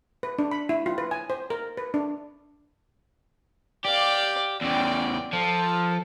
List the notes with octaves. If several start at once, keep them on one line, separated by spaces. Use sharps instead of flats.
B4
D4
B5
E4
F4
B4
G#5
C5
A#4
B4
D4
G4 D5 F5
E2 C#3 D5 G5
F3 A4